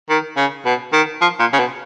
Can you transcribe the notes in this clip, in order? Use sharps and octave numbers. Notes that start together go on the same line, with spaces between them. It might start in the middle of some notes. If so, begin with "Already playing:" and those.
D#3
C#3
B2
D#3
F3
A#2
C#3
B2